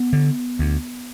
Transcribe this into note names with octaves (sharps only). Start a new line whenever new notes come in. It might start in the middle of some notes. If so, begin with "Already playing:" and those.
Already playing: B3
D3
D2